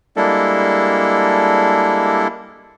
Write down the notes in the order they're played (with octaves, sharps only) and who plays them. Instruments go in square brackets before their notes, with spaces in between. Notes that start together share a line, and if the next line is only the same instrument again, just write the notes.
[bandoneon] G3 G#3 A#3 D4 E4 A4